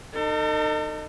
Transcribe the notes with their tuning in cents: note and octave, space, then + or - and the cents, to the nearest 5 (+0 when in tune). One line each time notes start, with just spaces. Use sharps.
D#4 -25 A4 +40